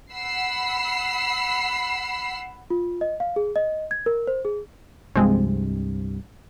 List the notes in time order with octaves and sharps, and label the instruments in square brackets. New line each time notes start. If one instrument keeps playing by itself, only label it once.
[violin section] F#5 B5 E6 C7
[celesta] F4
D#5
F5
G#4
D#5
G#6
A#4
C5
G#4
[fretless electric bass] C2 G2 C3 [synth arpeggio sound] F3 G#3 C4